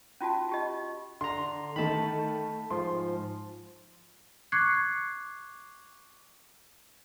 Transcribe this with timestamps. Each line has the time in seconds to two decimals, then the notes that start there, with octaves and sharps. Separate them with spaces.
0.21 C#4 F4 F#4 A5
0.49 F4 G4 D#5
1.21 D3 A#5 C6
1.76 D#3 A3 A5 B5
2.71 G#2 F3 C6
4.52 C#6 D6 F#6 G#6 C7 C#7